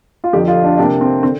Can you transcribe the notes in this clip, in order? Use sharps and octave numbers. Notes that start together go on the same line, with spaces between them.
F4
F2 D3 F3 G4
F4
D4
C3 A#3 D4
C4
D3 C4